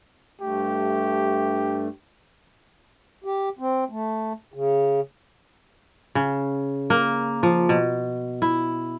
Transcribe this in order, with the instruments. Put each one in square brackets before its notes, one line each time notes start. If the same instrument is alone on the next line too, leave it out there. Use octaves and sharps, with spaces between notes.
[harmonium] G2 A3 [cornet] G4
[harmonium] G4
C4
A3
C#3
[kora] C#3
A#3
F3
B2
E4